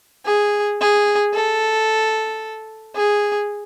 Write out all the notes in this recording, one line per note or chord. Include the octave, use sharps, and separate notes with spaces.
G#4
G#4
A4
G#4